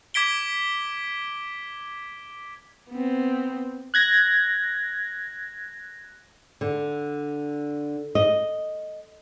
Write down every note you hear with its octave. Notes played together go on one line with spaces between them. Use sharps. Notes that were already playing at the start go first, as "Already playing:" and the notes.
D6 G#6 B6 D7 G7
B3 C4
F#6 G#6 A#6
D3
D#5